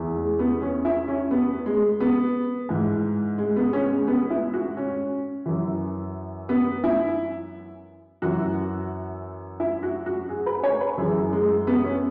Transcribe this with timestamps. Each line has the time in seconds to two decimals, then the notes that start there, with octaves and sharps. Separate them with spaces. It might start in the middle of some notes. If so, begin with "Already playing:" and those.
Already playing: E2 E3
0.16 G#3
0.39 B3
0.62 C#4
0.85 E4
1.08 C#4
1.31 B3
1.66 G#3
2.00 B3
2.69 G#2 E3
3.38 G#3
3.56 B3
3.73 C#4
3.90 G#3
4.07 B3
4.30 E4
4.53 F#4
4.77 C#4
5.46 F#2 E3
6.49 B3
6.84 E4
8.22 F#2 E3 F#4
9.60 E4
9.83 F#4
10.06 F#4
10.29 G#4
10.46 B4
10.63 C#5
10.80 B4
10.98 F#2 E3 G#4
11.33 G#3
11.67 B3
11.84 C#4